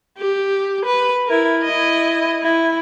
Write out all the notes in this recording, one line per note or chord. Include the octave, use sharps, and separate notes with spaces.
G4
B4
E4 A#4
E4 D#5
E4